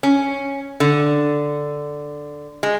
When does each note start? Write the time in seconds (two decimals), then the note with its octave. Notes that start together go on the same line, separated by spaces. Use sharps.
0.03 C#4
0.80 D3
2.63 G#3